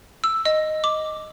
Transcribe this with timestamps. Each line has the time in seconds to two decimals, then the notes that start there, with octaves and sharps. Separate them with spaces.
0.24 E6
0.45 D#5
0.84 D6